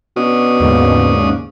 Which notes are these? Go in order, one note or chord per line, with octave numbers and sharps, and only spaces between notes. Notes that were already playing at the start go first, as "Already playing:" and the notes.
B2 C#4 D4 D#6
D#2 G#2 C#3